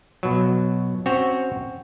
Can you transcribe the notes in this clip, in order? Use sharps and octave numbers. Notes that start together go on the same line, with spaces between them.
B2 F#3
C4 C#4 F#4 C#5